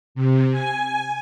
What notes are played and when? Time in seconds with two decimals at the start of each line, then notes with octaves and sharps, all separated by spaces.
0.15 C3
0.51 G#5